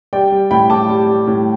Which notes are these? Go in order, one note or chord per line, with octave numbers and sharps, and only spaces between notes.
G3 D5 G5
G3
A2 G5 B5
A2 A5 D6
G3
G3
A2